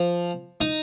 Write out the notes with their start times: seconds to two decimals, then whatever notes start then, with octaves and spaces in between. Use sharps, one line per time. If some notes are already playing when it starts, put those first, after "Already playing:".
Already playing: F3
0.61 D#4